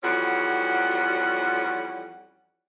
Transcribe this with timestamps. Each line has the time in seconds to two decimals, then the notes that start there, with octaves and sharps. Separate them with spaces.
0.03 F2 E3 G3 C#4 F#4 F#5